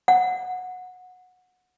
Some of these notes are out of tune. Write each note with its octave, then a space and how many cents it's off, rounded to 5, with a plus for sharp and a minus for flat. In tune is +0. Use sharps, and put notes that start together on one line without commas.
F#5 -20